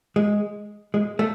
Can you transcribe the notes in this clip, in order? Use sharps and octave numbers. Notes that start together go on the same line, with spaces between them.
G#3
G#3
A3